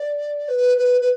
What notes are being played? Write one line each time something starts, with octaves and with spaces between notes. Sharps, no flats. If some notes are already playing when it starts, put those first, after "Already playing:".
Already playing: D5
B4
B4
B4